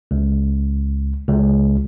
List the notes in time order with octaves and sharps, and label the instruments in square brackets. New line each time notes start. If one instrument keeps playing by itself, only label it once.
[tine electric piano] C#2
C#2